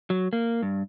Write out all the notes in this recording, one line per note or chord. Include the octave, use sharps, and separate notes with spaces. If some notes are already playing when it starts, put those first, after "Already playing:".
F#3
A#3
G2